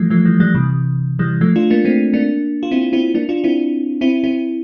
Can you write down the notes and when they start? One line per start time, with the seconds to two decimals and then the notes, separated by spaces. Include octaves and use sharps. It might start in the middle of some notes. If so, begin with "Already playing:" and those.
Already playing: E3 F3 G3 A3
0.10 F3 A3
0.25 E3 G3
0.40 E3 G3
0.55 C3 E3
1.19 E3 G3
1.41 F3 A3
1.56 D4 F4
1.70 A#3 D4
1.85 A3 C4
2.13 A#3 D4
2.63 F4
2.71 C4 E4
2.93 C4 E4
3.15 A#3 D4
3.29 D4 F4
3.44 C4 E4
4.01 C4 E4
4.24 C4 E4